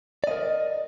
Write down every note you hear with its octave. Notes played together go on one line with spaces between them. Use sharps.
A#4 D5 D#5